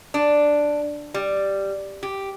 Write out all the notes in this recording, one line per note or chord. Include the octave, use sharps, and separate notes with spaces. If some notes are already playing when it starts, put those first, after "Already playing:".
D4
G3
G4